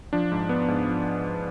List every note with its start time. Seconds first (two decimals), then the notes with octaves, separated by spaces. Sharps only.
0.13 F3 D4
0.32 G#2
0.49 B3
0.68 G#2
0.86 F3